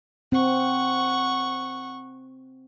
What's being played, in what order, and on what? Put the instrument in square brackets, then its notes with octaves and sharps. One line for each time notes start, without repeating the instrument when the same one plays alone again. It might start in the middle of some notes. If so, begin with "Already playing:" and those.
[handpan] C4 [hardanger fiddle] F#5 C#6